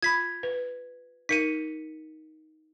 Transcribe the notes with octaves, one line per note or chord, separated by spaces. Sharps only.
F4 B5 G#6 B6
B4
D#4 A#4 B6 C#7 D#7